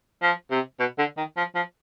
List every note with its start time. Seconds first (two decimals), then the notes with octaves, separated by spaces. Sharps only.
0.23 F3
0.51 C3
0.79 B2
0.99 D3
1.17 D#3
1.37 F3
1.55 F3